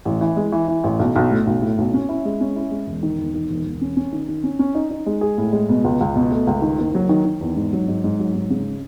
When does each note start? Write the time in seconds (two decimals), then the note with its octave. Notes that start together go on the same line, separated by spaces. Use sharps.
0.05 A1
0.21 E3
0.37 G#3
0.52 E3
0.68 E3
0.84 A1
0.99 B1
1.16 B1
1.31 A2
1.47 B1
1.62 A2
1.78 B1
1.94 C#4
2.09 E4
2.25 G#3
2.41 C#4
2.56 E4
2.71 G#3
2.87 E1
3.03 D#3
3.19 E1
3.34 D#3
3.50 E1
3.65 E1
3.81 C#4
3.97 C#4
4.12 D#3
4.29 D#3
4.44 C#4
4.59 C#4
4.75 D#4
4.91 D#4
5.06 G#3
5.21 G#4
5.38 A2
5.53 G#3
5.69 B2
5.84 C#2
6.01 C#2
6.16 B2
6.31 A3
6.47 C#2
6.62 D#3
6.78 F#1
6.95 F#3
7.09 D#3
7.25 D#3
7.41 E2
7.56 G#2
7.73 F#3
7.88 G#2
8.04 G#2
8.19 F#3
8.35 G#2
8.50 C#3